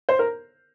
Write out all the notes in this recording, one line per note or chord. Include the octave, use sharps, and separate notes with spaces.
C5
A#4